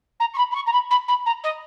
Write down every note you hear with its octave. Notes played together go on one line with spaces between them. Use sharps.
A#5
C#6
B5
B5
C#6
A#5
B5
B5
B5
A#5
D#5